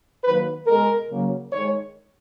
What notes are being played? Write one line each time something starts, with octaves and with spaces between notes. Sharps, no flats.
D#3 F#3 A#3 B4
B2 G#3 A#4
C#3 F#3 A#3
D#3 G#3 C#5